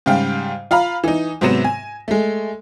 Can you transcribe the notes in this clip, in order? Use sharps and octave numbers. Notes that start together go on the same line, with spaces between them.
G#2 C#3 G3 F5 G5
F4 F5 A#5 B5
E3 D#4
G#2 C3 F#3 B3 A#6 E7
G#5
G#3 A3